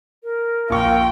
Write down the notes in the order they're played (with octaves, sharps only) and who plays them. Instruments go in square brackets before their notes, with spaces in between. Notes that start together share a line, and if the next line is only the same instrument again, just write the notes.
[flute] A#4
[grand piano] A#1 C#6 [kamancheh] F4 G5